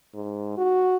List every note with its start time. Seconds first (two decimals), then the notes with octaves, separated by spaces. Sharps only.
0.14 G#2
0.57 F#4